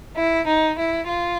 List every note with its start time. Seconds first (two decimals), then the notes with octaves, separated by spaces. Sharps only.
0.17 E4
0.47 D#4
0.79 E4
1.08 F4